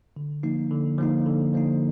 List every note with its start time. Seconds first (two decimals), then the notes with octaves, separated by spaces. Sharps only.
0.16 D3
0.43 F3 A#3 D#4
0.71 D3
0.98 F3 A#3 D#4
1.26 D3
1.54 F3 A#3 D#4